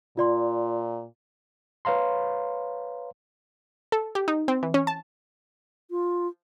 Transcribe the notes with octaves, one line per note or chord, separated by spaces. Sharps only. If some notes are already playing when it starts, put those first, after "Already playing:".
A#2 F4 D5 C6
B4 C#5 F5 A#5 C6
A4
G4
D#4
C4
E3
C#4
A5
F4